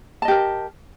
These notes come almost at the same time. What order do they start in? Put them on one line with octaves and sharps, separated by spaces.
A5 D#5 G4 A#4